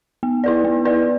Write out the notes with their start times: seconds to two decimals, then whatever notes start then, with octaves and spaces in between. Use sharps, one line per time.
0.23 B3
0.44 E4 B4 D5
0.64 B3
0.85 E4 B4 D5